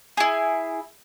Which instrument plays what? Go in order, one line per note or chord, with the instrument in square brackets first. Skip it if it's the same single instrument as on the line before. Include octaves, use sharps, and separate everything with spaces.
[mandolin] E4 G#4